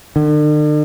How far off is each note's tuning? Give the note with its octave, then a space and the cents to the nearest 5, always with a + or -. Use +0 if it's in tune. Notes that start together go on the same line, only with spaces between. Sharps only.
D3 +45